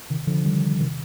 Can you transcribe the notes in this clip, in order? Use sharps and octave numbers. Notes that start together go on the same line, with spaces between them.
C3 D#3
D3 F3
D#3 G3
C3 D#3